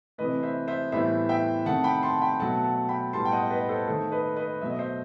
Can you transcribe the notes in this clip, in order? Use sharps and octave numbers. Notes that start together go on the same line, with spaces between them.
C3 E3 A3 B4 D#5
C5 E5
C5 E5
A2 E3 G3 B3 C5 E5
E5 G5
C3 D#3 A3 F#5 A5
G5 B5
A5 C6
G5 B5
B2 F#3 A3 F#5 A5
F#5 A5
G5 B5
A2 G3 B3 A5 C6
G5
D#5 F#5
B4 D#5
A4 C5
D#3 A3 A4 C5
B4 D#5
B4 D#5
B2 F#3 A3 E5
D#5
C5 E5